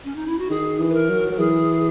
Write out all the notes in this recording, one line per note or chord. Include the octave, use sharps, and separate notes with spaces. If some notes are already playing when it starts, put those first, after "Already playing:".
C#4
D#4
E4
F#4
D#3 G#4
E3
B4
A#4
F#3
F#3
E3 G#4